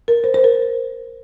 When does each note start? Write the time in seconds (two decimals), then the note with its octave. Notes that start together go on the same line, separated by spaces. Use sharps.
0.08 A#4
0.24 C5
0.34 C5
0.44 A#4